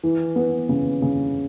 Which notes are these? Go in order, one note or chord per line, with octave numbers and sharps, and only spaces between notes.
E3
B3
C#3
C#3